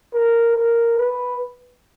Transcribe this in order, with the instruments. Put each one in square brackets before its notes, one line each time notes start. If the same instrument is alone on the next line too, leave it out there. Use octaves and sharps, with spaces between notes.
[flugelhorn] A#4
A#4
B4